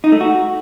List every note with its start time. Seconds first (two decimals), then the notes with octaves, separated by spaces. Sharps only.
0.04 D#4
0.12 A3
0.21 F#4